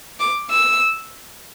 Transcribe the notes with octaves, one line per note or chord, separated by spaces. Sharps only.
D6
E6